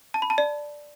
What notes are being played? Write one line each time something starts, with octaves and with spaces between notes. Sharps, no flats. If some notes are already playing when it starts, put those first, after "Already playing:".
A5
B5
A5
D5